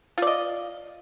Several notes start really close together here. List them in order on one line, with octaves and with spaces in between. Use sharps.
F4 D5 D#5